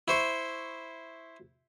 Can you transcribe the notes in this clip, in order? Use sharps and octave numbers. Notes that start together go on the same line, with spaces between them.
E4 C5 C#6